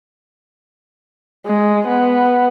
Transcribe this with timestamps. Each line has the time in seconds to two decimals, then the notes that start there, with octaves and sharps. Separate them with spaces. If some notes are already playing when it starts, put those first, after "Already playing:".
1.46 G#3
1.88 B3